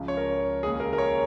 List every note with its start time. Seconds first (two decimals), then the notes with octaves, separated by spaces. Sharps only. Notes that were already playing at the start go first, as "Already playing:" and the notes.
Already playing: C#2 C#3 F3
0.08 C#5
0.17 A#4
0.62 D#2 C#3 G#3 C#4 G#4
0.80 A#4
0.93 A#4
0.98 C#5